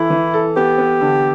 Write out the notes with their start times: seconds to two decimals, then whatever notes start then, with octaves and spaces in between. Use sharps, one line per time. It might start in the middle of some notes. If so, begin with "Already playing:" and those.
Already playing: E3 E4 A4
0.10 E3
0.34 A4
0.56 B3 G4
0.78 B3
1.01 D3